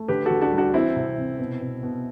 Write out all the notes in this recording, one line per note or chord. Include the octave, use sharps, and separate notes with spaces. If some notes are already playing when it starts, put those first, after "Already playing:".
Already playing: A3
D3 G4 B4
D3 F#4 A4
D4 F#4
G3
D4 F#4
E3 C4 E4
C3
C3
B2
B2
B2